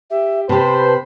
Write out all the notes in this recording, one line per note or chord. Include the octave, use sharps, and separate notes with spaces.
G4 E5
C3 G4 B4 C5 A5 B5